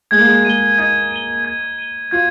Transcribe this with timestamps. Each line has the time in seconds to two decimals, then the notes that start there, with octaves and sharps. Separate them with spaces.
0.11 G#3 G#6
0.18 A#3
0.26 G#3
0.45 G#3 D#7 G7
0.78 D#4 G#6
1.11 D#7 G7
1.45 G#6
1.78 D#7 G7
2.11 F4 G#6